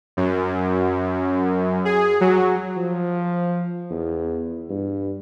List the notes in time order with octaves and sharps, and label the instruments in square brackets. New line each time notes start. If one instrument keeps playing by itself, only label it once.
[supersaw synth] F#2
G#4
F#3
[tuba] F3
E2
G2